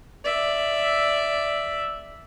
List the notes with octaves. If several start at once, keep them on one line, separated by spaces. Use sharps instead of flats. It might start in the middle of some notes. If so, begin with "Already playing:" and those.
D5 E5